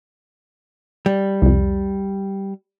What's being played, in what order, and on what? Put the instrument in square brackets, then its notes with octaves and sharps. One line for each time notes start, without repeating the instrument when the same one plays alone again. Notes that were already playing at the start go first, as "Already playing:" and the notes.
[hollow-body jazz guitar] G3
[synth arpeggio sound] C2 F2